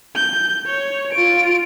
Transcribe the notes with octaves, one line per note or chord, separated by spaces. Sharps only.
G6
C#5
F4 D7